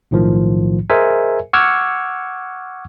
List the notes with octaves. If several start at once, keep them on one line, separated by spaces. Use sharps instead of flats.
B1 A2 D#3 F3
G#4 A#4 C5 D#5 E5 G#5
F#5 C#6 D6 E6 F6 G#6